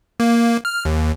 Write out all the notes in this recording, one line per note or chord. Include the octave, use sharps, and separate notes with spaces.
A#3
F6
D#2